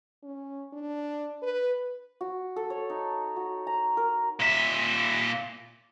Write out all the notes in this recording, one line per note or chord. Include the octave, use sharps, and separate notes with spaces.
C#4
D4
B4
F#4
A4
C#5
D#4
F#4
A#5
A#4
A#2 E5